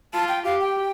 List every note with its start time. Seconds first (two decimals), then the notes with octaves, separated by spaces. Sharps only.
0.13 F4 A5
0.28 G5
0.45 G4 F5
0.61 G5